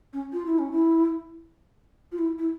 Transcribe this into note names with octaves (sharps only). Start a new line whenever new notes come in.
C#4
F4
E4
C#4
E4
F4
E4
E4